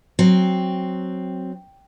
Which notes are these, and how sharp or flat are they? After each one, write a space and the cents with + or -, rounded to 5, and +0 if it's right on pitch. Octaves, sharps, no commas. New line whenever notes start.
F#3 +0 C4 +0